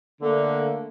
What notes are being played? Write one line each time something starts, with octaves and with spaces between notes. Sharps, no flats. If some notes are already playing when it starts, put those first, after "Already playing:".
D3 A3 A#3